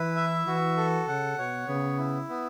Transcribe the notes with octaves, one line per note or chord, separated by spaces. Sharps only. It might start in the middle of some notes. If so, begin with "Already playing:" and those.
Already playing: E3 E4 B4
E5
E3 F#4
A4
C#3 F#5
B2 C#5
C#3 B3
E4
B3